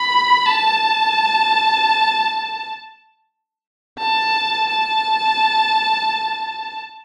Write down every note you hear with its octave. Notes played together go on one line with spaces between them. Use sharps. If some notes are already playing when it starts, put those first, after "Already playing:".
Already playing: B5
A5
A5
A5